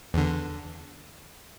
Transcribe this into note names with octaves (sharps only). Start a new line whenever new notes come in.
E2 D3